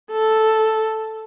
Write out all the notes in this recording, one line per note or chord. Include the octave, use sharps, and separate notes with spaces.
A4